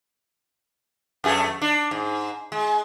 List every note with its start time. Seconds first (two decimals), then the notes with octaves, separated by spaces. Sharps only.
1.24 F2 A3 G#4
1.62 D4
1.91 G#2
2.52 G#3